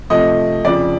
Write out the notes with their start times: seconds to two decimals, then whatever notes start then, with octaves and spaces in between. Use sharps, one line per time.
0.10 C3 F3 A3 D#5
0.65 F2 C#3 F3 D5